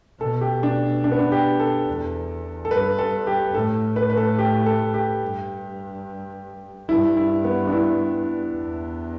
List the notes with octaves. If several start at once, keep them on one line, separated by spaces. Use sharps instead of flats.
B2 A4
G4
D4
D4
B3
D4
G4
A4
E2
A4
G2 B4
A4
G4
A2 A4
B4
B4
A4
G4
A4
G4
G2
G2 E4
E4
B3
D4
E4
E2